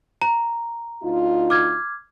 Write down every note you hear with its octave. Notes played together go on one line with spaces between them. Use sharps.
A#5
D2 D#4 F4
D6 F6 G#6